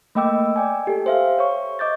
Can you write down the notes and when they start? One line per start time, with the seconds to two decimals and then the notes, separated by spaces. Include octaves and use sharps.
0.15 A3 A#3 D#5 G5 D6 E6
0.56 D5 G5 G#5
0.87 G4 A4
1.06 C5 E5 F5
1.38 C#5 C#6
1.79 D#5 D6 G6 A6